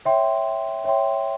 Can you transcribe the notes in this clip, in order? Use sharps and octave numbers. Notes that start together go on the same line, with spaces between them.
C#5 E5 G5 C6
C#5 E5 G5 C6